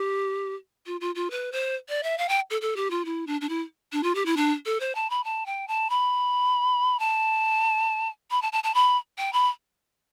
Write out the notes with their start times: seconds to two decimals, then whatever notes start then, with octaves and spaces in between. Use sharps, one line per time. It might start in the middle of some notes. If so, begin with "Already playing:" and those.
Already playing: G4
0.86 F4
1.01 F4
1.15 F4
1.31 B4
1.52 C5
1.89 D5
2.03 E5
2.18 F5
2.29 G5
2.50 A4
2.61 A4
2.76 G4
2.90 F4
3.05 E4
3.27 D4
3.41 D4
3.49 E4
3.92 D4
4.03 F4
4.15 G4
4.26 E4
4.36 D4
4.66 A4
4.80 C5
4.95 A5
5.10 B5
5.24 A5
5.46 G5
5.68 A5
5.90 B5
6.99 A5
8.31 B5
8.42 A5
8.52 A5
8.64 A5
8.74 B5
9.18 G5
9.33 B5